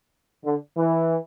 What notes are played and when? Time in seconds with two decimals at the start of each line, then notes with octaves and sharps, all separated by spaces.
0.45 D3
0.77 E3